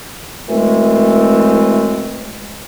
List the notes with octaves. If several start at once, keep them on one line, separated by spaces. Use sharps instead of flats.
F#2 E3 G#3 A3 C4